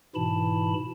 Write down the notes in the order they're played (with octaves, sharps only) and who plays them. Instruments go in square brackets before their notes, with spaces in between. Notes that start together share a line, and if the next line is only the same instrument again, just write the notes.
[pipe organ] G#2 B2 E3 E4 A5 B5